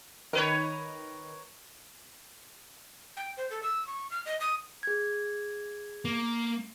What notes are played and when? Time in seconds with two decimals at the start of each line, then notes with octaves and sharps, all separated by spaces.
0.33 D#3 A#4 B4 C#5
3.17 G5
3.37 C5
3.51 A4
3.63 E6
3.87 C#6
4.11 F6
4.26 D#5
4.41 D#6
4.83 G#4 G#6
6.05 A#3